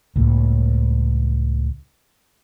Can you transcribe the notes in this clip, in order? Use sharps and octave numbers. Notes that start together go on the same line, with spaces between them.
C#2 A2 A#3